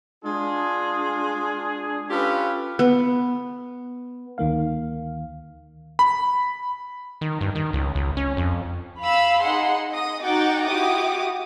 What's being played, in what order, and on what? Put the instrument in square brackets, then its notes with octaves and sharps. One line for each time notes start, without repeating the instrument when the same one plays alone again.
[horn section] G#3 D4 F4 G#4
C#4 F4 G4 A4 B4
[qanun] B3
[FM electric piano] D2 D#3 A#3 F5
[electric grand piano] B5
[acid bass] D#3
G2
D#3
C#2
C#2
C#4
F2
[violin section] F5 B5 E6
D#4 G#4 F#5 C6
D#5 D#6
D#4 F#4 F#5 G5 D6 A6
E4 F#4 G4 D6 D#6